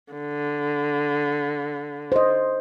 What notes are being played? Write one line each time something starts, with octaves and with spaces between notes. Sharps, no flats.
D3
C5 D#5